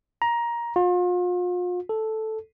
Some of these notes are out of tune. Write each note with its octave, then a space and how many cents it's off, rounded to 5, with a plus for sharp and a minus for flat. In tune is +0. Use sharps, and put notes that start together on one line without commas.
A#5 +15
F4 +40
A4 -5